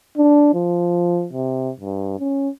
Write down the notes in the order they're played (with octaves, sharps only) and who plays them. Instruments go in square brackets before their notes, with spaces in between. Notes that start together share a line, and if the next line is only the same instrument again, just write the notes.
[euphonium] D4
F3
C3
G2
C#4